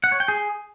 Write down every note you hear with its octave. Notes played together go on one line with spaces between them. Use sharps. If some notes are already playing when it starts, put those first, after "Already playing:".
F#5
C#5
G5
G#4